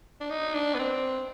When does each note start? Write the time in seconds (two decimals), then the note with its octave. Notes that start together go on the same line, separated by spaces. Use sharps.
0.21 D4
0.30 D#4
0.54 D4
0.75 B3
0.79 C4